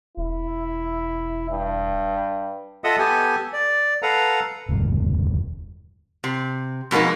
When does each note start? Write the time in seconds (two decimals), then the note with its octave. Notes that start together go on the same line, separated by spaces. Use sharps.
0.17 E1 E4
1.50 G2
2.84 F4 A4 D#5 E5 F#5 D#6
2.99 B3 G4 A4 G#5
3.53 D5
4.02 A4 B4 F5 F#5 A#5
4.69 E1 D2 G2
6.24 C3
6.91 F2 B2 G#3 A#3 D#4